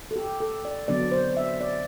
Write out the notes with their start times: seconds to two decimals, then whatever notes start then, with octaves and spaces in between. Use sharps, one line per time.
0.11 A4
0.16 G4
0.40 A4
0.65 D5
0.88 D3 F#3 B3 D4 D5
1.12 C5
1.37 E5
1.61 D5